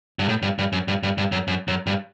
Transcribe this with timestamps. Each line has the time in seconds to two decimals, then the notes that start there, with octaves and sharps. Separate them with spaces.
0.19 G2
0.29 A2
0.42 G2
0.59 G2
0.73 F#2
0.88 G2
1.03 G2
1.18 G2
1.32 F#2
1.48 F#2
1.68 F#2
1.87 G2